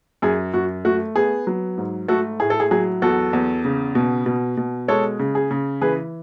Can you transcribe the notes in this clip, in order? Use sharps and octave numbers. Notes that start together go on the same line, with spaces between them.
F#2 G#4
F#2 F#4
A3 F#4
B3 G#4
F#3
G#2
A3 F#4 A4
A2 G#4
A4
G#4
F#3 G#4
E2 F#4 A4
E2
C#3
B2
B2
B2
G#3 A4 C#5
C#3
G#4
C#3
E3 G#4 B4